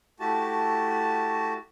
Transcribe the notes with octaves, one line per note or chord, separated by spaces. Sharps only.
A3 E4 F#4 G4 A5